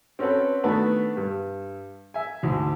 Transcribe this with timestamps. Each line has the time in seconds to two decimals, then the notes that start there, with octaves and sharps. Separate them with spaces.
0.19 C4 C#4 F#4 A4 B4
0.64 D#3 A3 B3 D4 F#4 B4
1.17 G2
2.14 E5 G#5
2.43 D2 G#2 E4